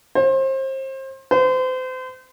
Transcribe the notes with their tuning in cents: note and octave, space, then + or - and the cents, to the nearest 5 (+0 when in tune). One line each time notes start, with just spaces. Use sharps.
C5 +30
C5 -35